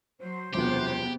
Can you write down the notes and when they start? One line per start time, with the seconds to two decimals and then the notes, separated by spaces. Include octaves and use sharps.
0.20 F#3 C5
0.54 E1 F#2 C3 F3 B3 G4